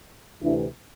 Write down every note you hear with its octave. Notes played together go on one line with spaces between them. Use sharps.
D2 C3 E3 D4 E4